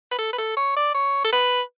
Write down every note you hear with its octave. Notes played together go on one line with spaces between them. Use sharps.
B4
A4
B4
A4
C#5
D5
C#5
A4
B4